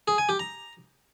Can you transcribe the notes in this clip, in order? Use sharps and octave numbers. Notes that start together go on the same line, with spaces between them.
G#4
G#5
G4
A#5